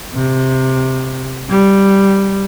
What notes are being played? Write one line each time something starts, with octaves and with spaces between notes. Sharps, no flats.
C3
G3